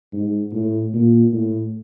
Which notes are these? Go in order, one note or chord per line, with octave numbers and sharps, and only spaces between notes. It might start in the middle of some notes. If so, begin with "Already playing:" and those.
G#2
A2
A#2
A2